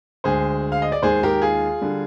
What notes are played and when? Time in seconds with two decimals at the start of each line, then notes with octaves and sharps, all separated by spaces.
0.24 D2 D3 G#3 G#4 C5
0.72 F5
0.82 D#5
0.92 D5
1.02 D#2 D#3 G#3 G#4 C5
1.23 G4 A#4
1.42 F4 G#4
1.81 D3 G3